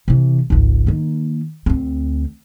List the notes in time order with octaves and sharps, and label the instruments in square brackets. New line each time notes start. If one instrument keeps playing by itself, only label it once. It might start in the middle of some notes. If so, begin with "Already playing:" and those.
[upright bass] C3 E3
G#1 C#2
D#3 A#3
D2 C4